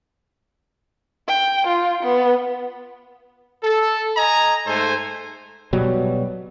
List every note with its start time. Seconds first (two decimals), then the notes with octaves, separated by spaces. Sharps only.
1.28 G5
1.67 F4
2.03 B3
3.63 A4
4.17 D#5 G#5 A#5
4.67 G#2 A3 A4 C5 G#5
5.73 B2 F#3 G3